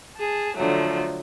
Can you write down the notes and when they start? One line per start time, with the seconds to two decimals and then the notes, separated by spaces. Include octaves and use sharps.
0.17 G#4 A5
0.56 D3 F3 F#3 A3